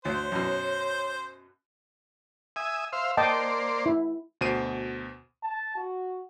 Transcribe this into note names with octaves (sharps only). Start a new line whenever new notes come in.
D2 C5 C#5
F#2 B2
E5 G#5 D#6
C5 E5 F5
A#3 C5 D5 D#5 G5 A5
E4
D2 B2 C5 C7 D7 D#7
A5
F#4